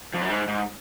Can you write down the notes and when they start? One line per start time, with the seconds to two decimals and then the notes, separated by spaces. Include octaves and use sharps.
0.14 F2
0.22 F#2
0.29 G#2
0.48 G#2